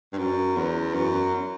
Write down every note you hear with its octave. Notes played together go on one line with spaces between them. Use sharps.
G2
F#2
E2
F#2